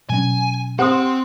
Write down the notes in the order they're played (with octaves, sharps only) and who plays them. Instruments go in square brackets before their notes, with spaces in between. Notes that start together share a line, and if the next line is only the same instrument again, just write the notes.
[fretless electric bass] B2 F#3 C#4 [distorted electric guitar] G#5
[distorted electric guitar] C4 [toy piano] G4 C5 D#6 [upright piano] F#5 C6